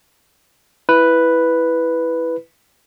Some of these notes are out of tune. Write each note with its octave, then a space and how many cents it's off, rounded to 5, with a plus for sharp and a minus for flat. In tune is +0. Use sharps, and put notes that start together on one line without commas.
E4 +0 B4 +0